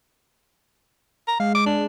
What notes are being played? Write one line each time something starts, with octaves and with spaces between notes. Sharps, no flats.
A#5
G#3 F5
D6
D4